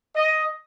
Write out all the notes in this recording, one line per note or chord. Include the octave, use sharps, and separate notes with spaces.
D#5